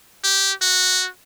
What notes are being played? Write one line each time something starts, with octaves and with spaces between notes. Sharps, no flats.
G4
F#4